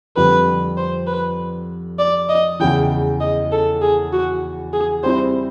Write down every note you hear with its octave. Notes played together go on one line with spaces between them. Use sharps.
F2 D3 G3 B4
C5
B4
D5
D#5
E2 C#3 E3 G5
D#5
A4
G#4
F#4
G#4
G3 C4 E4 C5